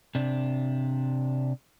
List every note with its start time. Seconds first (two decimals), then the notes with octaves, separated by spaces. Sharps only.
0.15 C3 D4